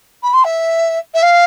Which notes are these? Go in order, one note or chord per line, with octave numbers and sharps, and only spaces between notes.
B5
C6
E5
E5
F5